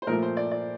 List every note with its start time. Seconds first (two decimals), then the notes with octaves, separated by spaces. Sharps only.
0.02 C5
0.07 A#2 F3 A3 A#4
0.22 C5
0.37 D5
0.51 D5